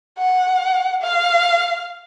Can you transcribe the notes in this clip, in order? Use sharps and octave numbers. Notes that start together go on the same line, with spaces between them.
F#5
F5